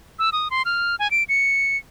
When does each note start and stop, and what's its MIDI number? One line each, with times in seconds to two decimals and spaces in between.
0.19 0.30 88
0.33 0.48 87
0.51 0.62 84
0.65 0.96 89
0.99 1.10 80
1.11 1.23 98
1.29 1.77 97